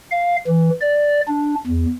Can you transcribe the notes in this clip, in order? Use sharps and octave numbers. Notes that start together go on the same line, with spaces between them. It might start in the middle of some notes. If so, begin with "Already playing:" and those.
F5
E3
D5
D4
E2